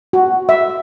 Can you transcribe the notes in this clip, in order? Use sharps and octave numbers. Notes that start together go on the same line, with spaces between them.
F#4
E5